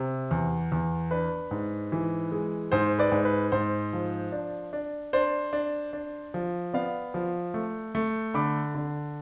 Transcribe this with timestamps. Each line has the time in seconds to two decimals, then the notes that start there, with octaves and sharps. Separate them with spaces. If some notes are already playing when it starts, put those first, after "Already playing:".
Already playing: C3
0.31 E2
0.72 E2
1.11 D4 B4
1.51 G#2
1.92 E3
2.32 G#3
2.72 G#2 C5
2.99 B4 D5
3.12 G#2
3.25 B4
3.52 G#2 C5
3.93 F3
4.32 D4
4.73 D4
5.13 D4 C5
5.53 D4
5.93 D4
6.34 F3
6.73 B3 D5 F5
7.14 F3
7.54 A3
7.95 A3
8.34 D3 B5 D6
8.75 D3